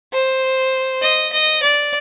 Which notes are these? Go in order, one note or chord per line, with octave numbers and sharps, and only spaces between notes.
C5
D#5
D#5
D5